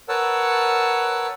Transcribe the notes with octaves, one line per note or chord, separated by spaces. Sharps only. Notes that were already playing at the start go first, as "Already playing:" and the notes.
A#4 B4 C#5 F#5 A5 E6